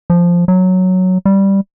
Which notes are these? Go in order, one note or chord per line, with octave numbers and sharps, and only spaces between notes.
F3
F#3
G3